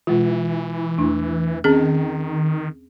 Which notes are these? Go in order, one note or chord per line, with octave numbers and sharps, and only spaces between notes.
B2 E3 G#3 F4
E2 A3 D4
D#3 C4 C#4 G#4